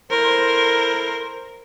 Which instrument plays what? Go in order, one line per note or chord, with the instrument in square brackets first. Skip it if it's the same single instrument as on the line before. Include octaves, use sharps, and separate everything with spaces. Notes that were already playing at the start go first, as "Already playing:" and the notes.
[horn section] E4 A4 C5 [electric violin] A#4